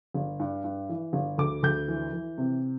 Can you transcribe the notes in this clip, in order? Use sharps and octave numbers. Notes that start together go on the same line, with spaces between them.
G1
G2
G2
E3
G1
D2 D6
D2 G6
E3
E3
C3